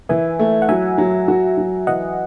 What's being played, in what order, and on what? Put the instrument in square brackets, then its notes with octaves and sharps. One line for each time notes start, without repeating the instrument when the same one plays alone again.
[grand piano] E3 [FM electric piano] E5 G#5
[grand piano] A3
[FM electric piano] F#5
[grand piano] F#3 [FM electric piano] E5 G#5
[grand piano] F#3
F#4
F#3
[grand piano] E3 [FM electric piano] D#5 F#5